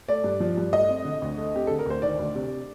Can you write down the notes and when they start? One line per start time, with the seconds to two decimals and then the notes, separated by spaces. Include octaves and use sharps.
0.09 A3 D5
0.24 G2
0.40 F3
0.57 G2
0.73 A3 D#5
0.89 C4
1.05 D3
1.22 D2
1.38 A3
1.54 C4 G4
1.67 D3 A4
1.79 A#4
1.86 D2 C5
2.02 D#3 D5
2.19 D2
2.35 C3